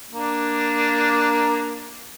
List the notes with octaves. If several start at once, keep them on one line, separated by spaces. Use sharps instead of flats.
A#3 D4